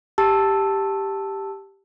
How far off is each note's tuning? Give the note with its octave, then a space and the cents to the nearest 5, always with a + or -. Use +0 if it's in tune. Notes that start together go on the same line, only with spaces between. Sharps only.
G4 +0 A5 +5 E6 +0